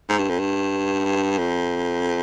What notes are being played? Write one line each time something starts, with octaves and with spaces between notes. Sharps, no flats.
G#2
G2
F2
G2
F2